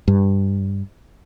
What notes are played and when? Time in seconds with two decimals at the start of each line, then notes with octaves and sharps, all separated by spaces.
0.08 G2